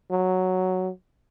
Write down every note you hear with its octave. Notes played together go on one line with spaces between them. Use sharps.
F#3